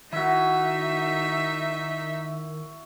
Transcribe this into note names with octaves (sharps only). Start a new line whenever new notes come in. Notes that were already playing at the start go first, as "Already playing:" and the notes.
D#3 D#4 E4 F#4 E5